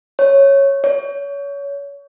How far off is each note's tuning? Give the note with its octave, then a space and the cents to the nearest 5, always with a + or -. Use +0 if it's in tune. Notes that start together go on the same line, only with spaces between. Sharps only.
C#5 -5
C#5 +30